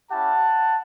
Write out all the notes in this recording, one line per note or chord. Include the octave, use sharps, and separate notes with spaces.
C#4 E4 G4 F#5 A5